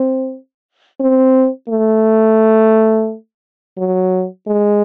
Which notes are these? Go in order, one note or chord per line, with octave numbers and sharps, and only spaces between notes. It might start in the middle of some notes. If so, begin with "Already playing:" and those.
Already playing: C4
C4
A3
F#3
G#3